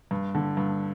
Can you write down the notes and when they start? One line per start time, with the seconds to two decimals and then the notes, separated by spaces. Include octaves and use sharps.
0.11 G2
0.35 D3
0.57 G2